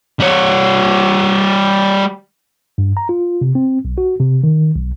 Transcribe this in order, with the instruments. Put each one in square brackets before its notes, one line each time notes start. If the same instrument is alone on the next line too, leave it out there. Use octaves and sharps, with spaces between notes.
[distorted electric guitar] G3 C#5
[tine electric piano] G2
A#5
F4
C3
C4
B1
F#4
C3
D#3
B1